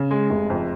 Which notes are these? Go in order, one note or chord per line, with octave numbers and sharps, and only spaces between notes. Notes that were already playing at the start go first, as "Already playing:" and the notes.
Already playing: C#3
G#3
F1
F2